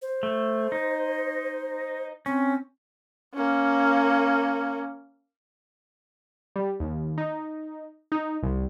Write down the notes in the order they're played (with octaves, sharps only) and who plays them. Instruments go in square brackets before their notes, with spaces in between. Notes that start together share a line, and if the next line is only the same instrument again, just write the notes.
[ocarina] C5
[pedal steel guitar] A3
D#4
[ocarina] C4 [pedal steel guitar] C#4
[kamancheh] A#3 C#4
[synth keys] G3
D#2
D#4
D#4
C2